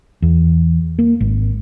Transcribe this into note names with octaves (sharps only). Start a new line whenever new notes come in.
E2
A#3
G#1